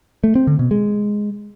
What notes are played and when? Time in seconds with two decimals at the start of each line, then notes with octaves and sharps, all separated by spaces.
0.24 A3
0.35 C4
0.47 D3
0.59 B2
0.71 G#3